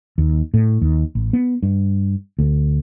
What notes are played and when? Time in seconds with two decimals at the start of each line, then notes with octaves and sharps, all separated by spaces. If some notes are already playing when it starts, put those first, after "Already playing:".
0.18 D#2
0.54 A2
0.81 D#2
1.15 A1
1.33 B3
1.63 G2
2.39 D2